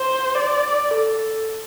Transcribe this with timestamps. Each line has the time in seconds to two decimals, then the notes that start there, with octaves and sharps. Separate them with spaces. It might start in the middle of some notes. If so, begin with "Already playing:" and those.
Already playing: C5
0.35 D5
0.91 A4